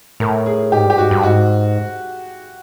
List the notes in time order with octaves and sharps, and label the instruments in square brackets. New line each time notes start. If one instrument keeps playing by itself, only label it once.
[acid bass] A2 [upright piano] A#4
[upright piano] G#4
[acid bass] G#2 [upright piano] G4
[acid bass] G2 [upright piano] G4
[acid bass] G#2 [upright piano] F#4
[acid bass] G2
[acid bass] G#2 [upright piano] F#4